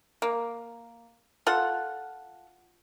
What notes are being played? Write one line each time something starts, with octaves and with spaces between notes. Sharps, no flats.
A#3
F4 A4 F#5